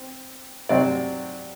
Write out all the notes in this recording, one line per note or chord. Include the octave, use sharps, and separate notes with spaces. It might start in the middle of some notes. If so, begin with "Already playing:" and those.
Already playing: C4
C3 F#3 C4 D5